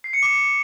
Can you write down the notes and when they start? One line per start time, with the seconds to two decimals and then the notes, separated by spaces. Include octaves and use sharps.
0.04 C7
0.13 C#7
0.23 D6